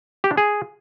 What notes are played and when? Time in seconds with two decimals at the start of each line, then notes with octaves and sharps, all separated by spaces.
0.24 G4
0.31 D4
0.37 G#4